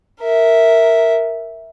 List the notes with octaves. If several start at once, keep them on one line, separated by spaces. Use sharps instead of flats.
A#4 E5